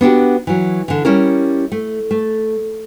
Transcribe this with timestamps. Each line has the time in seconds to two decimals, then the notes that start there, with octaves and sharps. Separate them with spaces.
0.01 B3 D4 F#4 G4
0.47 E3 F#3
0.88 D3 E3
1.05 G3 C#4 E4 A#4
1.72 A3
2.11 A3